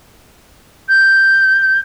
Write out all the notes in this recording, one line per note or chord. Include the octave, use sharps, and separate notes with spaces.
G6